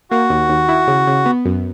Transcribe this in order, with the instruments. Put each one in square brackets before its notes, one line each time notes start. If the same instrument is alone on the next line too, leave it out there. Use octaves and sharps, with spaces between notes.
[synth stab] A#3 [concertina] F#4
[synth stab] D#2
D#2
E4
C#3
C#3
B3
F#2